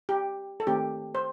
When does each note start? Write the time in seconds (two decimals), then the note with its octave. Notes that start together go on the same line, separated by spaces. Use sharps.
0.09 G4
0.60 A4
0.67 D#3 A3 C4 G4
1.15 C5